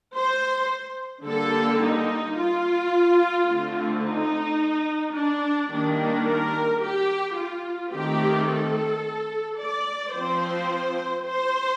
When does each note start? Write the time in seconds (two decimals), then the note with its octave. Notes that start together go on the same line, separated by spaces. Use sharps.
0.15 C5
1.25 D3 G3 A#3 D4 A4
1.82 D#4
2.37 F4
3.48 D3 A3 C4
4.04 D#4
5.14 D4
5.70 D#3 G3 A#3 D4
6.25 A#4
6.81 G4
7.36 F4
7.91 D#3 A3 C4 G4
8.47 A4
9.58 D5
10.14 F3 C4 C5
11.25 C5